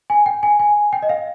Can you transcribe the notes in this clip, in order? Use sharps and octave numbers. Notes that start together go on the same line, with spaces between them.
G#5
G5
G#5
G#5
G5
D#5
F5